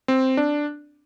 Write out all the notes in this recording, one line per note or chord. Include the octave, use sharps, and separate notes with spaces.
C4
D4